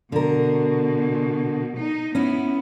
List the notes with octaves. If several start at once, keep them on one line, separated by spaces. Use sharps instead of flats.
B2 D3 A#4
D#4
B3 C#4 E4